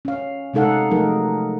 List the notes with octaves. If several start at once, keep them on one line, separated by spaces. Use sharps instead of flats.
C#4 F5
C3 G#3 D#4 A4 F5 F#5
F3 F#3 A3 D#4 G#4 A#4